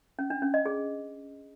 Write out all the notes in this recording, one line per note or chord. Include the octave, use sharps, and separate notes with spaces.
C#4
D4
C#4
D#5
G#4